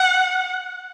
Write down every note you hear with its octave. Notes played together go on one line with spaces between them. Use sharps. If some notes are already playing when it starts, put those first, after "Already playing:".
Already playing: F#5